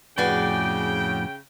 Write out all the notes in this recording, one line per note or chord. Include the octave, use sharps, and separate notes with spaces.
F2 A2 C#3 F#4 G#4 B4 D5 G5